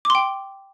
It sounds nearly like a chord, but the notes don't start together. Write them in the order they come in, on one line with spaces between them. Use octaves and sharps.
D6 C6 G5